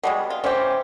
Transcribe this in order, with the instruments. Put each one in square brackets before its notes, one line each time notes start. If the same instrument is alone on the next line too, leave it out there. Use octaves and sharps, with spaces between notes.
[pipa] B2 G3 G#3
F4
[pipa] E3 G4 [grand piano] C#4 C5